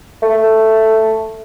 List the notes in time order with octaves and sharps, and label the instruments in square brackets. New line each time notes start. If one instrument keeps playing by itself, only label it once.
[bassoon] A3